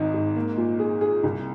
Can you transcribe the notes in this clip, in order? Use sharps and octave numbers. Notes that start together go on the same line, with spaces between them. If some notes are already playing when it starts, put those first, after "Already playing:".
Already playing: G#1 G#2 D#4
G#2
A#3
A#2
G#4
G#4
C2